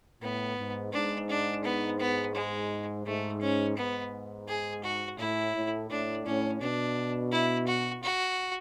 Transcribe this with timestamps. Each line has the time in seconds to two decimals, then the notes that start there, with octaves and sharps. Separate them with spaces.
0.22 A2 B3
0.57 G#2
0.93 G#2 D4
1.29 D4
1.64 B3
1.99 B3
2.35 G#3
3.06 G#2 A3
3.41 C#4
3.77 G#2 B3
4.48 G#4
4.83 F#4
5.19 A2 E4
5.54 A2
5.90 A2 D4
6.26 A2 C#4
6.61 B2 D4
7.32 E4
7.67 F#4
8.03 F#4